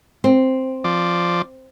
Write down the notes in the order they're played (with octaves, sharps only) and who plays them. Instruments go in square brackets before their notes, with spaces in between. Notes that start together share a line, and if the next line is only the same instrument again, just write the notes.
[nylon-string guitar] C4
[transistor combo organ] F3 D5